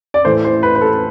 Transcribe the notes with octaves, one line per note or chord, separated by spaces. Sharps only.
D5
A2 E3 A3 C5
C5
B4
B4
A4